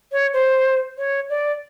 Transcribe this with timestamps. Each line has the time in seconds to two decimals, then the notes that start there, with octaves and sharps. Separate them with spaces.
0.12 C#5
0.33 C5
0.98 C#5
1.30 D5